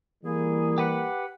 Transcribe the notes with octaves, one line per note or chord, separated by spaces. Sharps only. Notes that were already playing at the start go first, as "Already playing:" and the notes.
E3 G3 A#3 E4 G#4
G4 B4 F#5